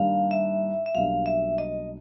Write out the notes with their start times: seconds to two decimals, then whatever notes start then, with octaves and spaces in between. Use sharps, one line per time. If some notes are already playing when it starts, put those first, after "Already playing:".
Already playing: G2 D#3 G3 A#3 D4 F5
0.31 E5
0.86 E5
0.94 B1 B2 G3 A#3 D4 F5
1.26 E5
1.58 D#5